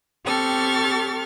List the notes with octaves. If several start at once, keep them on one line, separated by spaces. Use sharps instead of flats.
C4 G4 A4 C#6 F6 A6